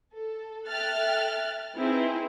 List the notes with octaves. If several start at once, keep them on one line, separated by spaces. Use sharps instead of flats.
A4
A4 E5 G5 F6 F#6 A6
C4 D#4 E4 G#4 B4